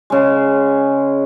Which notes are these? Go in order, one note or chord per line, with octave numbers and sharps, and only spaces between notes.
C#3 G#3